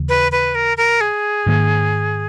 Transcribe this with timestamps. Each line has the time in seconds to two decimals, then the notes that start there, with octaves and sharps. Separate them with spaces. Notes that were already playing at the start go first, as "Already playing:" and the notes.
Already playing: D#2 C#3 E3
0.09 B4
0.32 B4
0.55 A#4
0.77 A#4
1.01 G#4
1.46 G#2 D#3 A#3